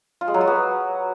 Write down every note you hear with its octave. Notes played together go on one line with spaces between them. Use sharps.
F4
G#3
F#3
F#4
B3